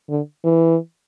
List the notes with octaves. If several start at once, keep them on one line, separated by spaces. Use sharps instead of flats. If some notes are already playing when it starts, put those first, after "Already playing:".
D3
E3